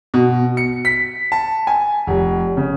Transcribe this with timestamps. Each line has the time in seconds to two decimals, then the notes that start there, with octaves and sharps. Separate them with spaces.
0.14 B2
0.57 C#7
0.85 B6
1.32 A5
1.67 G#5
2.07 F1
2.57 C#3